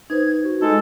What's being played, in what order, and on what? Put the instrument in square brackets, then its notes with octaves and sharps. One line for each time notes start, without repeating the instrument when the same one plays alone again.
[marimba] D#4 B4 C5 [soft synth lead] G#6
[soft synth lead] F#4
[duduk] G#3 [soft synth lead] D#4 [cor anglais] A4